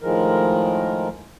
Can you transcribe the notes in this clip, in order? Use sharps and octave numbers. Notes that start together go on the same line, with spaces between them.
A2 D#3 F3 G#3 A#4